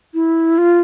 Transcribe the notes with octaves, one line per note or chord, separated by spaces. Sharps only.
E4
F4